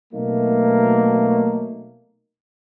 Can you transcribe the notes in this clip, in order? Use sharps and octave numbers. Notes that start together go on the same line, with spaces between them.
B2 F#3 A3 A#3 D#4